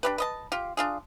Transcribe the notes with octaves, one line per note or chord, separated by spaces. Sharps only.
D4 G4 B4
B4 D#5 A5
F4 G4
D4 F4 G#4